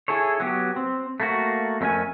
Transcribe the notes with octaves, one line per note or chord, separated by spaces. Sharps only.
E4 G#4 A4 C#5
F#3 B3 G4
C4
A3 A#3 F#4
F2 A3 C#4 A#4 G#5